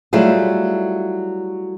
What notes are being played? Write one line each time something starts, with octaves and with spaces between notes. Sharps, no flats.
F#3 G3 A3 E4 F4 G#4